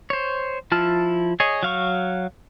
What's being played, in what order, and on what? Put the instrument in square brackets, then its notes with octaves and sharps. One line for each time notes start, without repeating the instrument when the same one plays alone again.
[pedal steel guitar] C5 C#5
F3 E4 F4 A5 F6
G#4 C#5 D#5
F#3 F5 C#6